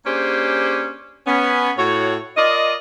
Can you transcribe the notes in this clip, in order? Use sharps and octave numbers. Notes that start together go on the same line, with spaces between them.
A#3 C#4 D4 G4 G#4 C5
B3 C#4
A2 F#4 C#5
F4 A#4 D5 D#5